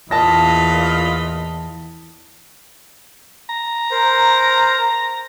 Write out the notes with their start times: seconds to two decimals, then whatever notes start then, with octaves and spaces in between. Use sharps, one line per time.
0.11 E2 A#2 F4 D#5 A5 B5 A#6
3.49 A#5
3.91 A#4 C5